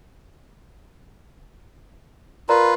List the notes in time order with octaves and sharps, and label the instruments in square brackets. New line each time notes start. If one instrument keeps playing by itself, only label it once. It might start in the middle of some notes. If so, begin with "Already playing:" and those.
[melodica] F4 B4 [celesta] A#4 D5 A#5